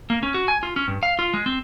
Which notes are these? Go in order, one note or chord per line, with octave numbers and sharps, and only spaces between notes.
A#3
C#4
F#4
G#5
F4
C#4
G2
F5
F4
G#3
C4